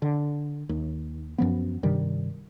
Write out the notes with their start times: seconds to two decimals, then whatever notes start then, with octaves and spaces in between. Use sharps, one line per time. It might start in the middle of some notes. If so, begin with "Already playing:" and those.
0.02 D3
0.69 D#2
1.38 F#2 F3 B3
1.83 G2 C3 D#3 G3